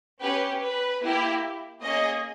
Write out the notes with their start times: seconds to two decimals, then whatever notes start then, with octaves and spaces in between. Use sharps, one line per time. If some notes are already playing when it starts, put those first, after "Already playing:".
0.21 C#4 G4 B4
0.62 B4
1.03 A#3 E4 G4
1.83 A#3 C#4 G#4 D#5